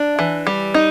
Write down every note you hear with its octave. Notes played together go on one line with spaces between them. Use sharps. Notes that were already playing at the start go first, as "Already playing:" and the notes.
Already playing: D4
E3
G3
D#4